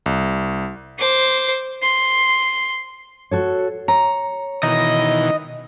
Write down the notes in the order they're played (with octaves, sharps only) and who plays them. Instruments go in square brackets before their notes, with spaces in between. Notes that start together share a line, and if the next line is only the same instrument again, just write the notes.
[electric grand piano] C2
[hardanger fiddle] C5 D6
C6
[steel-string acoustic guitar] F#4 A4 C#5
[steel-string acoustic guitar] C#5 [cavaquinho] A#5
[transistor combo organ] B2 D#3 E3 [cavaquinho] D#4 [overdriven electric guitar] D#5